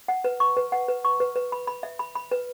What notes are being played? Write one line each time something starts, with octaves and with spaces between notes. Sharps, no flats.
F#5
B4
C#6
B4
F#5
B4
C#6
B4
B4
B5
B5
E5
B5
B5
B4